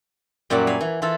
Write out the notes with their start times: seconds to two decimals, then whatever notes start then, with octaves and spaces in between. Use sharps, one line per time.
0.50 F#2 A#2 G3 E5 F#5
0.67 F5 G#5 B5
0.81 E3
1.02 E3 F4 A4 E5